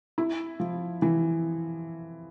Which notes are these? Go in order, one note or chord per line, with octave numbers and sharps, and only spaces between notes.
E4
F3
E3